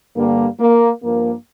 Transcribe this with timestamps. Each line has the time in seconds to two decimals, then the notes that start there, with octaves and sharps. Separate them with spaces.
0.16 G2 D3 G3 A#3
0.59 A#3
1.02 G2 F3 A#3